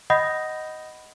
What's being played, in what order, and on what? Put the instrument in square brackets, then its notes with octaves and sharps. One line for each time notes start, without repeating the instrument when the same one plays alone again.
[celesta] D#5 F#5 B5 D#6 G6 A#6